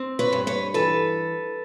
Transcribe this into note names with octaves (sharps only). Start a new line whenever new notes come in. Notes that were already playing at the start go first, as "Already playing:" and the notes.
Already playing: C4
B4 C#5
G2
B4 C#5
E3 A4 B4